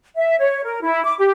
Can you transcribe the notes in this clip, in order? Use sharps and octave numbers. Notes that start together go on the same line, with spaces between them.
E5
C#5
A#4
E4
D6
G4